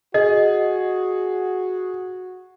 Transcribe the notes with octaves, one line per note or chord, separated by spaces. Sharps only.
F#4 G#4 D#5